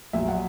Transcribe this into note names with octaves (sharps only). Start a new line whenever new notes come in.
A#1 A#2 F#3 E5
F#5